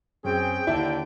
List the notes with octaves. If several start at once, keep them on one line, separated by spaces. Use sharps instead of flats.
F#2 C4 C#4 G#4 G5
D#2 D3 E4 D5 A5